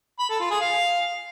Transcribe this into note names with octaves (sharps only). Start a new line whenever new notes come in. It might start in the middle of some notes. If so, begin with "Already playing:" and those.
B5
A4
F4
G#4
F5